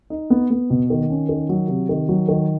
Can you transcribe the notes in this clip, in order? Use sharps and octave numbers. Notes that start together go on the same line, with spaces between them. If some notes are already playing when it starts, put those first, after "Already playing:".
D#4
B3
B3
B2
D#3
C#4
D#3
F#3
C3
D#3
F#3
D#3